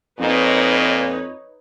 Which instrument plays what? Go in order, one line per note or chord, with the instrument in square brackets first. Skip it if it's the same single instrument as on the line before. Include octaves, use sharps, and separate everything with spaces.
[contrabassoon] F2 [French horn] A#2 [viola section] D#4 B4 C#5